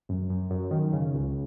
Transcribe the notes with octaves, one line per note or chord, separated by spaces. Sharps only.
F#2
F#2
F#2
D#3
C#3
C#2